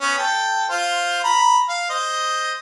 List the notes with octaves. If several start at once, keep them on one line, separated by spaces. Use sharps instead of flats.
B3 C#4
A4 G5
F4 C5
A#5 B5
F5
C5 D#5